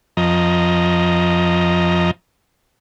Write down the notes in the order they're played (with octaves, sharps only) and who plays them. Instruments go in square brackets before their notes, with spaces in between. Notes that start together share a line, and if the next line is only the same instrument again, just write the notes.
[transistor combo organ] F2 F3 D#5 A#5